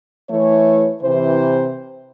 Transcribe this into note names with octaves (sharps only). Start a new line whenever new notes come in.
E3 A3 C#5
C3 E3 C5